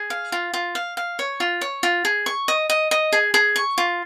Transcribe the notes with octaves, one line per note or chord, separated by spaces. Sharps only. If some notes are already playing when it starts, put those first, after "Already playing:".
Already playing: G#4
F5
F4
F4
F5
F5
C#5
F4
C#5
F4
G#4
C#6
D#5
D#5
D#5
G#4
G#4
C#6
F4